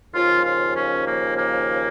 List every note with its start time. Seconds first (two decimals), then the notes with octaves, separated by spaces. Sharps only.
0.14 D#2 C#3 F3 F4
0.44 F4
0.74 C#4
1.06 A#3
1.36 A#3